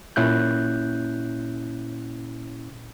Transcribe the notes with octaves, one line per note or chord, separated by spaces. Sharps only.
A#2 C#4 E4 F#6 G6